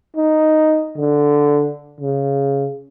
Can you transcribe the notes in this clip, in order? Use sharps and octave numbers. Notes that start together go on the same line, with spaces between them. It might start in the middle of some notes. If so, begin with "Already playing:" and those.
D#4
D3
C#3